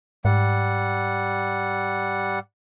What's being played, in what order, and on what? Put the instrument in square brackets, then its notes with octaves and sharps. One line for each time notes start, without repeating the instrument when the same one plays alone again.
[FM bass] G#2 [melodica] G3 F#5